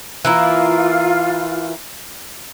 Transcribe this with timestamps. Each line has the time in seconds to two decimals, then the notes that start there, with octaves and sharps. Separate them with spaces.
0.25 E3 A#3 E4 F4